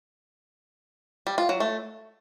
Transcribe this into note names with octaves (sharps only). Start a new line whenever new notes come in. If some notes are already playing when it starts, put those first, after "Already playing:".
G3
F4
F#3
A3